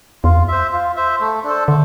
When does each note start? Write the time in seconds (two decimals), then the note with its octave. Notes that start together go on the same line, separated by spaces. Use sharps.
0.24 E2 F4
0.37 F2
0.48 C5 E5
0.72 F4
0.96 C5 E5
1.20 A3
1.44 D4 A4 C5
1.68 D3 A3